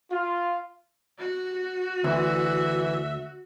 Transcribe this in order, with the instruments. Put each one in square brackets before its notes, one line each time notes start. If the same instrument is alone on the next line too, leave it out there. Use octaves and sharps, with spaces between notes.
[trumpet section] F4
[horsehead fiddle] F#4
[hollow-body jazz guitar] D2 [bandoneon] E3 [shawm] E5